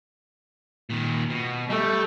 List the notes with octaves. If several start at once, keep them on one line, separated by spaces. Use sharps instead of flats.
A#2 D#3
B2
G3 A3